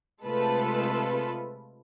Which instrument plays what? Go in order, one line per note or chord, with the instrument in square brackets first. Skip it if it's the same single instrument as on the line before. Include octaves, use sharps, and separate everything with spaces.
[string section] C3 G#3 A3 F4 A4 B4